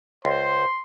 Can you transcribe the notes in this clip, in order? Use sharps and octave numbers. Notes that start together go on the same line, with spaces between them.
C#2 C5 C6